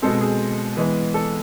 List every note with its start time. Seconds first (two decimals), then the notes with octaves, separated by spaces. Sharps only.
0.02 B2 G#3 C4 A4
0.21 G#4
0.77 E3 G#3 B3
1.14 A4